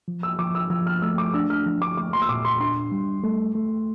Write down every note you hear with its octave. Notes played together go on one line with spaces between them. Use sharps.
F3
E6
F3 D6
E6
F3 E6
F6
A3 E6
D6
D4 E6
F6
F3
D6
A3 D6
C6
E6
A#2 D6
C6
D4 C6
G3
A3
A3